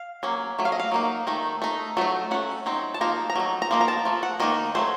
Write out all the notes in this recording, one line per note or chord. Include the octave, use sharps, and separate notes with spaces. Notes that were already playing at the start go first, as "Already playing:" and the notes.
Already playing: F5
F#3 A#3 C#4
F#3 A3
F5
D#5
F5
F#3 A#3 D#4
D#3 A3 D#4
A3 D#4
F#3 A3 D#4
A3 C#4 F#5
F#3 C4 D#4
A5
F3 A#3 D#4 A#5
A#5
F#3 A3 D#4
A#5
F3 A#3 D#4
A#5
A5
F3 A3
F#5
D#3 A#3 D#4 D#5
F#3 A3 C#4 C5